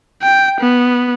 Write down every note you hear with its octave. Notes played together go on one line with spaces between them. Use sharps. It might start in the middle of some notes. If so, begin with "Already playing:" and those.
G5
B3